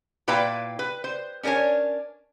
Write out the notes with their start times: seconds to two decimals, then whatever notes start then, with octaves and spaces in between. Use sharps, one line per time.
0.28 A#2 E4 B4 F5 G5 A#5
0.79 B4
1.04 C5
1.43 C#4 D4 A#4 C#5 G#5